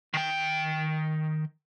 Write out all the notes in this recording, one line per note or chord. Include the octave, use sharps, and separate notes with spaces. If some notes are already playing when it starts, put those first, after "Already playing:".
D#3 G5